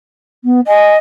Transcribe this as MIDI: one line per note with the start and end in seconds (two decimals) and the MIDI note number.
0.44 0.60 59
0.67 0.98 75
0.67 0.93 80